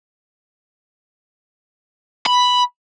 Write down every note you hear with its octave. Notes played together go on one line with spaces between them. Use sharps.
B5